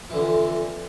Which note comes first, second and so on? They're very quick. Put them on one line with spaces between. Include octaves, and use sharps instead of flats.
E3 D3 F2